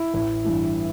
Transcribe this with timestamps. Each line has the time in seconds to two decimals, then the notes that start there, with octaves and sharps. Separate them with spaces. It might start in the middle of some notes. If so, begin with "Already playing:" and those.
Already playing: E4
0.14 A1
0.44 G2 E3